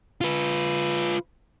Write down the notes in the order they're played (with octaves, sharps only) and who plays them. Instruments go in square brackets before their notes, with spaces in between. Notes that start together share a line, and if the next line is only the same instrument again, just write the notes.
[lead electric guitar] F4 B4